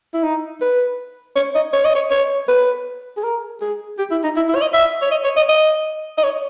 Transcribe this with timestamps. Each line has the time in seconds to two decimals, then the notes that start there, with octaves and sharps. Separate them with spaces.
0.14 E4
0.23 D#4
0.61 B4
1.36 C#5
1.55 D#5
1.73 C#5
1.85 D#5
1.95 C#5
2.11 C#5
2.48 B4
3.17 G#4
3.23 A#4
3.61 G#4
3.98 G4
4.11 E4
4.24 D#4
4.36 E4
4.49 E4
4.55 C#5
4.61 D#5
4.74 E5
5.02 C#5
5.11 D#5
5.24 C#5
5.36 D#5
5.49 D#5
6.18 D#5
6.23 C#5